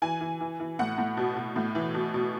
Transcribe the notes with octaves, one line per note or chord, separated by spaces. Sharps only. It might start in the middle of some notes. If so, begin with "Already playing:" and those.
E3 G#5
E3
E3
E3
A2 F#5
A2
B2
B2
A2
E3
B2
B2